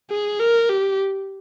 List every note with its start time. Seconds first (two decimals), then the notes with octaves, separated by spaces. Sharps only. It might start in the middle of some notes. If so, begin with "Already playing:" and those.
0.11 G#4
0.40 A#4
0.70 G4